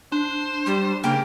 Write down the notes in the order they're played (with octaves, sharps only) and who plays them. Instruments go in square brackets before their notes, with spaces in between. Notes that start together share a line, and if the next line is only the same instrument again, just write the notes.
[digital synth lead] D4 [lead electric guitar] C5
[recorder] G3
[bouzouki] C#3 G4 A#4 [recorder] A#3